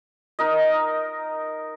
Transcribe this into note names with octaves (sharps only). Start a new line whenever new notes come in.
D#4 A#4 D#5